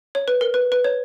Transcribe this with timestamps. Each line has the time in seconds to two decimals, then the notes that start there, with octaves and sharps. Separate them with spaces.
0.15 C#5
0.28 B4
0.41 A#4
0.54 B4
0.72 B4
0.84 C#5